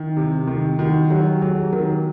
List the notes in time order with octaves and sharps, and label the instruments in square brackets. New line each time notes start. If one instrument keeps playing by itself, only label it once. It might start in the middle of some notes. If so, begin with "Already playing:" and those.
Already playing: [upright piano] D#3 [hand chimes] E4
[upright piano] C3
D#3
[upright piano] D#3 [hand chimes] F#4
[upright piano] F#3 [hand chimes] G4
[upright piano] F#3 [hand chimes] G#4
[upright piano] D#3 [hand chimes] A#4